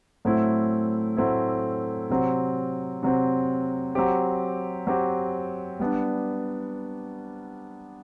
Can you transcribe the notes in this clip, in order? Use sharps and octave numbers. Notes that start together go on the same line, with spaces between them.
A2 F#3 A3 C4 E4
A2 F#3 A3 C4 E4
C3 F#3 C4
C3 F#3 C4
F#3 C4 G4
F#3 C4 G4
G3 B3 D4